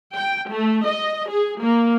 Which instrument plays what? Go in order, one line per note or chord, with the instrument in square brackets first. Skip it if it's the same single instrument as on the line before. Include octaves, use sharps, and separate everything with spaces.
[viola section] G5
A3
D#5
G#4
A#3